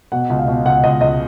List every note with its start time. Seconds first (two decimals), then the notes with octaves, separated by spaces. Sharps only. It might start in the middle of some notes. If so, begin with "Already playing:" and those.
0.12 B2 F#5
0.30 C#2
0.39 F5
0.48 B2
0.66 C#2 F#5
0.84 C#2 D#5
1.01 C#2 D#5